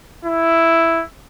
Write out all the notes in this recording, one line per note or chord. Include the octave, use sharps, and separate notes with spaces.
E4